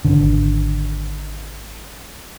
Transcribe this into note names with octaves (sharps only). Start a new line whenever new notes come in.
G#1 D3